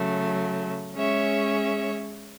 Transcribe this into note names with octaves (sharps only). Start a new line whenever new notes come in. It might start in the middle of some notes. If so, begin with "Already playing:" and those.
Already playing: C#3 F#3 A3
G#3 C#4 G#4 C#5 E5